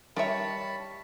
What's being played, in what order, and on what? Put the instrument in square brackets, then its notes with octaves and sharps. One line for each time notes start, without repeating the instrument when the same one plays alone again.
[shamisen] D#3 D#4 E5 [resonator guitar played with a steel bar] G3 C#5 [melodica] A5 B5